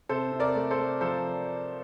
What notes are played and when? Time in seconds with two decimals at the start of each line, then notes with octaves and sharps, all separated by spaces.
0.09 C3 A4 C5
0.32 C3
0.40 A#4 D5
0.55 A3
0.71 A4 C5
0.79 A3
1.01 F3 A4 C5